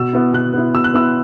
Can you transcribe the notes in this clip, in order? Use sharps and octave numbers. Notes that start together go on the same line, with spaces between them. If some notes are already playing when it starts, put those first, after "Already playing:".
Already playing: B2 E6
B3 E4
B2 F#6
B3 E4
B2 E6
F#6
B3 E4 E6